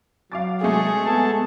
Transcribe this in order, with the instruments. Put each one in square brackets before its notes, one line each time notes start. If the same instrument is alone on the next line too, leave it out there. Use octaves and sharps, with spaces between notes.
[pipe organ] F#3 [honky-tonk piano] F5 D6 A6
[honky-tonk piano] C3 G#3 A3 [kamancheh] G#4
[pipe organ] B3 A4 A5